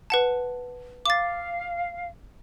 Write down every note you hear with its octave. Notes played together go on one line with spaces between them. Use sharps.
B4 F#5 A5
F5 D6 A6